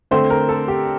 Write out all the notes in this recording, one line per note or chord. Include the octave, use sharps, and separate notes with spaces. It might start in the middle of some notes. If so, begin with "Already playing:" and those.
D3 A3 C4 C5
A#4
A4
G4